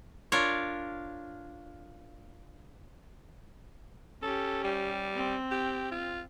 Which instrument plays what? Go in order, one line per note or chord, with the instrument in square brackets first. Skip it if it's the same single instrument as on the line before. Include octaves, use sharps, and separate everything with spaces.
[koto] D4 F4 A#4 C#5
[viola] C#4 G4 [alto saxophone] A4
[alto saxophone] G3
[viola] C4
[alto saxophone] G4
F4